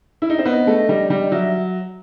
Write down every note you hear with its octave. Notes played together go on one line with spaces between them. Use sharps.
E4
D#4
C4
B3 D#5
A3
G3
G3
D#5
F#3 E5